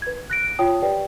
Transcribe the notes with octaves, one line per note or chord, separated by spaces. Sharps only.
B4 G#6
F#6 A#6 D7
F4 C#5 G5 A5 D#6
G4 B4 D5 G5